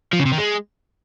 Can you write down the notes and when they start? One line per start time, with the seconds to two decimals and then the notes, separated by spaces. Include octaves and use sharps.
0.13 F3
0.19 C#3
0.26 C3
0.32 D#3
0.38 G#3